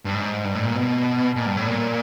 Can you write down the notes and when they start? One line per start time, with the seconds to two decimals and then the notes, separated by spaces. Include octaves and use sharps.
0.05 G2
0.15 G#2
0.45 G2
0.55 A2
0.65 A#2
0.76 B2
1.36 A#2
1.47 G2
1.57 A2
1.68 A#2